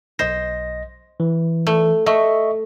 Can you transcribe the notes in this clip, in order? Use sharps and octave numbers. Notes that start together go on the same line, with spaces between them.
B1 C5 D#5 A#6
E3
A3
A3 D#5 E5 C#6